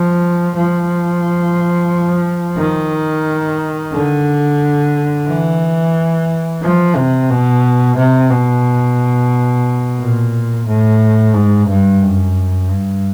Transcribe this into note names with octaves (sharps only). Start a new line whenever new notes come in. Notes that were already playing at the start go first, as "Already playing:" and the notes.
Already playing: F3
F3
D#3
D3
E3
F3
C3
B2
C3
B2
A#2
A2
G#2
G2
F#2
G2